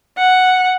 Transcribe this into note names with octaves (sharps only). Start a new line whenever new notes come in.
F#5